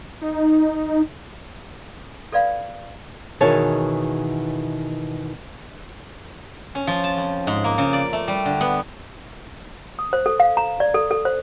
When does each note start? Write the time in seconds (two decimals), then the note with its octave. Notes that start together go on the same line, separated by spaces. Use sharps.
0.22 D#4
2.32 A4 B4 D5 F5 B5
3.41 B2 D#3 E3 G#4 C#5 A5
6.75 C#4
6.87 F3
7.04 A5
7.17 F2
7.47 G#2
7.64 A#3
7.78 C#3
7.93 D5
8.13 A3
8.28 G3
8.45 D3
8.61 B3
9.99 D#6
10.13 C5
10.26 A4
10.40 F5
10.57 A#5
10.80 D5
10.94 A4
11.11 A4
11.25 C5